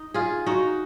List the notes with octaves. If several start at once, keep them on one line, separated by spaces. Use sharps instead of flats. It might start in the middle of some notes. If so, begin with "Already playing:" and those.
Already playing: D#4
F4 G#4
D#4 F#4